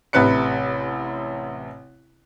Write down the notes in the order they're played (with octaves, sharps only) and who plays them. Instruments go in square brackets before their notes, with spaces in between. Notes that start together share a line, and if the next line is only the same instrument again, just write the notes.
[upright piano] A1 C3 B4 F#6 C#7